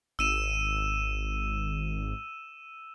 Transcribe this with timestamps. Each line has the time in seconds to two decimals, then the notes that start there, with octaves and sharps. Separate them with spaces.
0.19 G#1 E6 D#7 E7